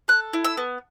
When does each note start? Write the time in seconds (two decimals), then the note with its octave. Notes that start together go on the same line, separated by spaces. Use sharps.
0.08 A4 F#6
0.33 E4
0.44 E6
0.57 B3